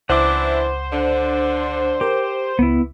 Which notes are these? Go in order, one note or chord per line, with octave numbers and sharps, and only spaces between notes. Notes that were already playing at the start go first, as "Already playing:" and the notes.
C#2 E3 D4 E4 C5 F#5 D6
D3 D4
G4 A#4
C#2 B3 E4